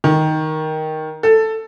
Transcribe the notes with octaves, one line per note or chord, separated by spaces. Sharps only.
D#3
A4